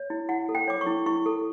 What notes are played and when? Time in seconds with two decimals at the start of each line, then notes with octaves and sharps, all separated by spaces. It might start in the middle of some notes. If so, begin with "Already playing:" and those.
Already playing: C#5
0.10 E4
0.29 E4 F#5
0.49 A4
0.55 G5
0.68 C#5 D6
0.81 C#6
0.87 E4
1.06 E4 C#6
1.26 A4